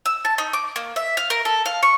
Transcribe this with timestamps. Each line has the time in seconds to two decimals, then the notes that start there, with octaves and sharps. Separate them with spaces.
0.06 E6
0.25 A5
0.38 D#4
0.53 D6
0.76 A#3
0.96 E5
1.17 F5
1.30 A#4
1.45 A4
1.66 F5
1.83 C#6